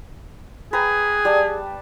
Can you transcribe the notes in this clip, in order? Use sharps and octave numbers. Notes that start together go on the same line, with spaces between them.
G#4 B4 G5 A#5
G3 A5